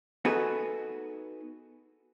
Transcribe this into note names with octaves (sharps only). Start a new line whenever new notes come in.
B3 D#4 F#4 G#4 A4 B4